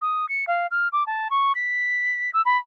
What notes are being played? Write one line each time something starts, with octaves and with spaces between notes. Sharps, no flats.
D#6
C#7
F5
F6
D6
A5
C#6
B6
E6
B5